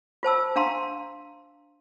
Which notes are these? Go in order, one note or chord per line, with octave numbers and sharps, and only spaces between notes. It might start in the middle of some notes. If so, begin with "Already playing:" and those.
F4 C5 A5 E6
D4 F5 A#5 C6